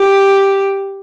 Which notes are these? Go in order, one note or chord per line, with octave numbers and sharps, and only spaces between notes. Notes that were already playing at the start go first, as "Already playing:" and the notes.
Already playing: G4